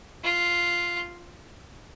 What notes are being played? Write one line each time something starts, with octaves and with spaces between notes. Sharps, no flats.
F4